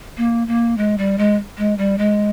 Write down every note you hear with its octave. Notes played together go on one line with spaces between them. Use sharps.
A#3
A#3
G#3
G3
G#3
G#3
G3
G#3